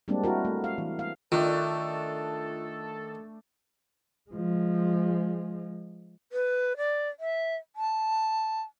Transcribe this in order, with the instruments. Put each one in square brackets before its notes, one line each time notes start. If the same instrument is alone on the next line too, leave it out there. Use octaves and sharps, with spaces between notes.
[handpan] G3 G#3 A#3 C4 D4
E4 F#4 A#4
A3
F5
E3
F5
[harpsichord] D#3 [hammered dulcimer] A3 D4 [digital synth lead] F4 [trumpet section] A4
[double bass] F3 G#3
[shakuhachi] B4
D5
E5
A5